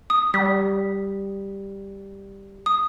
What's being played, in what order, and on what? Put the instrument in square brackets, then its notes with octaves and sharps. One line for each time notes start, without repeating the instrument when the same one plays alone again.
[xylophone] D#6
[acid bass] G3 [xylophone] B6
[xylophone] D#6